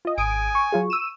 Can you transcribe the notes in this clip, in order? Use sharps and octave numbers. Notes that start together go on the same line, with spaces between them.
F4 D#5
G#1 G#5 D#6 D7
C#6
F#3 F4 G#4
E6 D#7 E7